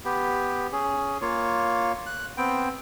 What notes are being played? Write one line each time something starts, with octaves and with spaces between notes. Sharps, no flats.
B3 G4
C#4 G#4
A#3 F4 C#5
F#6
B3 C4 G5